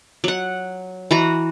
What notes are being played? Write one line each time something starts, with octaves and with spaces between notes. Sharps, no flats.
F#3 F#5
E3 F#4 A#5